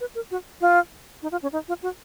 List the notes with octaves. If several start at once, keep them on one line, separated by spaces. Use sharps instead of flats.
B4
A#4
F#4
F4
D#4
F4
C#4
D#4
F4
F#4